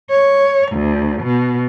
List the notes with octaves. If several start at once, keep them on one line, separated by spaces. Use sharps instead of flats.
C#5
D2
B2